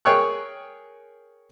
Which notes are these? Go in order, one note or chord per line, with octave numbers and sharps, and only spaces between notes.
G#4 A#4 C#5 G5 C#6 F#6